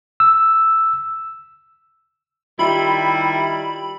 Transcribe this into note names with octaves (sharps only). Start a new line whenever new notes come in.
E6
D#3 G3 E4 F4 G4 B5